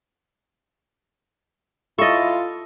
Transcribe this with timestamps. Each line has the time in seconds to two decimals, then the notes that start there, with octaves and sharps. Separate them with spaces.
1.99 E4 F4 A4 D#5 C#6 A6